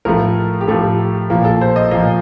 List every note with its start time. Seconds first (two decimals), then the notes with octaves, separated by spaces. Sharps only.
0.05 A2 F3 A3 A#4
0.61 G4
0.67 A2 F3 A3 A4
1.30 A#2 F3 A#3
1.45 A4
1.61 C5
1.76 D#5
1.91 A#2 F3 A#3 D#5